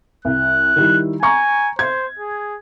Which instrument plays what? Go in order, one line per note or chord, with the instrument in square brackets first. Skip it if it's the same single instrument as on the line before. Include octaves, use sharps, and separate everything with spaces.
[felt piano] C2 [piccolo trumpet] F#6
[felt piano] D#3 G3 E4
[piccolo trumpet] G#5 [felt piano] A#5 C#6
[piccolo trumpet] C5 [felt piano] G#6
[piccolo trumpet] G#4